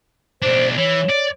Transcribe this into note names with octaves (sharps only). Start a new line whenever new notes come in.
B1 D4 C5
E3 C#5
D5